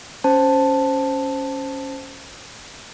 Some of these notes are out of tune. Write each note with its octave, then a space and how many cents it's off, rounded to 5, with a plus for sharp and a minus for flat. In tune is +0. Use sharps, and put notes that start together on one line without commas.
C#4 +0 C5 +0 A5 +0